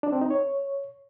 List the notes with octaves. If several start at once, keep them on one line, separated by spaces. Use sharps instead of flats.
D4
C4
D#4
C#5